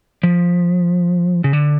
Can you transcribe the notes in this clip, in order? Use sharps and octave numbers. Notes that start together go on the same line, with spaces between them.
F3
C#3
D3